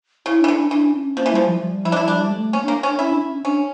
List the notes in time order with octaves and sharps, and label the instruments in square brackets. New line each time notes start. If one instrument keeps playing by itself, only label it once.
[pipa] C#3 [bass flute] E4
[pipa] E3 [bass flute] D4
[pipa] D3
[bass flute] D4
[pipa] E3 [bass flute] D4
[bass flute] C#4
[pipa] F3 [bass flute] A#3
[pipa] E3
[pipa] F3 [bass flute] G3
[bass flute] F3
G3
[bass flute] F3 [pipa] E4
[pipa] D4
E4
[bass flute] G3 [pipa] D4
[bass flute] A3
[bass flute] A#3 [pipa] C#4
[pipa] A#3 [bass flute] D4
[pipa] C#4
[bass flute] D4
[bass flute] C#4 [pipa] E4
[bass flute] D4
C#4
[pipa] C#4 [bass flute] D4